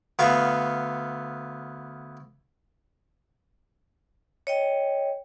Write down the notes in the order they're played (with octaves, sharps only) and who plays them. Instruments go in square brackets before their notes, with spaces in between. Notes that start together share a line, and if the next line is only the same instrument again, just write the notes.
[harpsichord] D2 B3 F5 C#6
[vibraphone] C#5 D#5 G5